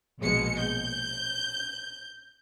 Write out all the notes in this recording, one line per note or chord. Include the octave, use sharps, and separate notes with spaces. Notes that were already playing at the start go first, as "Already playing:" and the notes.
A#1 B2 G#3 C#7
G6